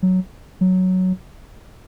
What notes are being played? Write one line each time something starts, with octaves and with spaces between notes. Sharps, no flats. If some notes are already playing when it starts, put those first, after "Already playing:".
F#3
F#3